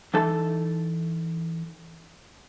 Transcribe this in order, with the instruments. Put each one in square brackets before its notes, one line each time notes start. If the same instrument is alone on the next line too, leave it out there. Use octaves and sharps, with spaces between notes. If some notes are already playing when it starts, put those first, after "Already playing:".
[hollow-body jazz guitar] E3 D#4 A4 A5